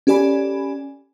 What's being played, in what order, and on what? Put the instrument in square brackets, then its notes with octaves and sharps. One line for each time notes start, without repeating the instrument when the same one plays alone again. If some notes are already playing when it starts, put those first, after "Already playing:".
[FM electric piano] C#4 G4 A4 D5 G#5 B5